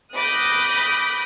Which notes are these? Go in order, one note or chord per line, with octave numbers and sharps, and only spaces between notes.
B5 D6 D#6 F#6 G6 A#6